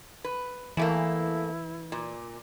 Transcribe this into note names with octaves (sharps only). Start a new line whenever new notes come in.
B4
E2 E3 A3 A#3 E4
A#2